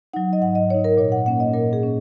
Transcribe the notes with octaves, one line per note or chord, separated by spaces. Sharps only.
F#3 D#4 F#5
D#5
G#2 F#5
D#5
F#3 D#4 C#5
A#4
A#2 C#5
F#5
A#3 C#4 F#5
D#5
A#2 A#4
G#4
A#3 C#4